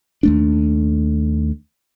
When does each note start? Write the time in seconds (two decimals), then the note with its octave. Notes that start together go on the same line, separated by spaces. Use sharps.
0.23 D#2 A3 D4